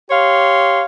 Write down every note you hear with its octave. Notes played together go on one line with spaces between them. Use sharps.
G4 C#5 F5 C6